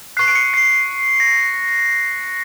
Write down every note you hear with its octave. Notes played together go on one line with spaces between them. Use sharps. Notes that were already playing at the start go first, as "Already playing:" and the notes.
C#6 F#6 C7
D7
C#7
C7
A#6